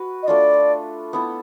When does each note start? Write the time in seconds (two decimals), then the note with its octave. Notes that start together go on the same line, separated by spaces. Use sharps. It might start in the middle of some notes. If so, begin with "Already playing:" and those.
Already playing: F#4 B4
0.23 D#5
0.28 A3 D4 F4 D5
1.13 B3 E4 A4